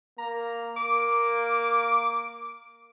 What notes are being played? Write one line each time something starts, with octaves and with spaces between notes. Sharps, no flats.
A#3 A#5
A#3 D6